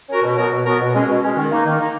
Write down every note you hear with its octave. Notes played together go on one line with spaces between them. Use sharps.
C#4 F#4 A#4
B2
F#3 B3 F#4 A#4
B2
F#3 B3 F#4 A#4
B2
G#3 C#4
B2
G#3 C#4
D#3
A#3 D#4
D#3
A#3 D#4